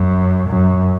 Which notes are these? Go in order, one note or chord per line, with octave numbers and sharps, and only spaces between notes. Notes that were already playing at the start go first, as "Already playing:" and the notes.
Already playing: F#2
F#2